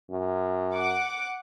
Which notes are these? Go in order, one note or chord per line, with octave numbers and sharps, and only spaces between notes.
F#2
F#5 D6